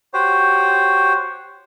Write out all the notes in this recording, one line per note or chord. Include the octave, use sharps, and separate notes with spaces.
F#4 G4 C5 C#5